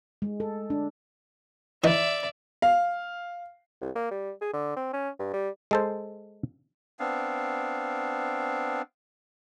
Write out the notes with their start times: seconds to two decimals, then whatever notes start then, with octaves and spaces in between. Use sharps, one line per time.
0.22 G#3
0.40 A4
0.70 D4
1.84 E3 D#4 D5 E5
2.62 F5
3.82 C2
3.95 A#3
4.11 G3
4.41 G#4
4.53 D3
4.76 C4
4.93 C#4
5.19 G2
5.33 G3
5.71 G#3 A4 C5
7.00 B3 C4 D4 F5